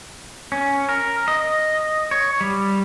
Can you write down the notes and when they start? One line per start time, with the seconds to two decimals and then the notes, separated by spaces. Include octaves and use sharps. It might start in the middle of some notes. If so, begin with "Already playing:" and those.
0.52 C#4
0.89 A#4
1.28 D#5
2.11 C#5
2.41 G3